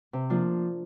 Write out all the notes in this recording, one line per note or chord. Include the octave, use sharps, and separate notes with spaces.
C3
F3 A#3 D4 F4